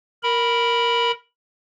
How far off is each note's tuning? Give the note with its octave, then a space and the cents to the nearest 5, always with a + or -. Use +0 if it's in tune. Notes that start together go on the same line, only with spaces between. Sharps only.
A#4 +0 B5 -10